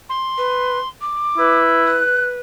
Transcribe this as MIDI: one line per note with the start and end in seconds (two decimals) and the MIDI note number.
0.09 0.88 84
0.38 0.79 71
1.01 1.59 86
1.38 2.00 64
1.38 2.40 71
1.87 2.26 90